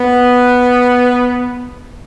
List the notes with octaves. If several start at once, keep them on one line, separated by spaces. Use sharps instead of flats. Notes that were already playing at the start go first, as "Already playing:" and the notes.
Already playing: B3